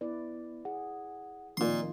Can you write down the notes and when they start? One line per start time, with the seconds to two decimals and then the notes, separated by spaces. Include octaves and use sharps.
0.01 B3 E4 B4 D5
0.65 G#4 F#5
1.57 A#2 D#3 F3 A#3 C4 D#4 F4 C6